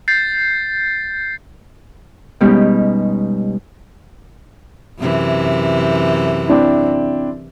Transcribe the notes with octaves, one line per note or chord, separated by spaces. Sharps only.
G6 A6 C7
B2 G3 G#3 C#4 D#4 G4
F#2 C3 E3
C4 D4 E4